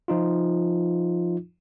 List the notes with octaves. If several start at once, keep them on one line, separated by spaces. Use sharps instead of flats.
F3 D#4 F4